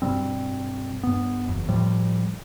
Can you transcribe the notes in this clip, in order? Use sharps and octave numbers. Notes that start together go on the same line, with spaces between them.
G2 B2 G3 C4
G2 B3
F#1 E2
A2 F3 G3